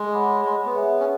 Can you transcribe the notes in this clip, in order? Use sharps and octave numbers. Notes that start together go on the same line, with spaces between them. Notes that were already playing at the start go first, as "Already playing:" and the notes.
Already playing: G#3
C#5 F#5 B5 D6
G#3
B3
G#4 C#5 E5 G#5
C#4